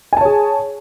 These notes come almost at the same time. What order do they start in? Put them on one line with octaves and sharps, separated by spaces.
G#5 A5 C#5 G#4